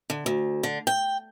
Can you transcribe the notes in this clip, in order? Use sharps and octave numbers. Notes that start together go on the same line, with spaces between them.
D3
D2
D3
G5